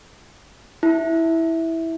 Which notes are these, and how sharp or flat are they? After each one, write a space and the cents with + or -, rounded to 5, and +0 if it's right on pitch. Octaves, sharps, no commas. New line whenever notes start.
E4 -10